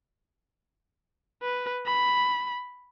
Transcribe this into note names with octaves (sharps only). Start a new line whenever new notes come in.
B4
B5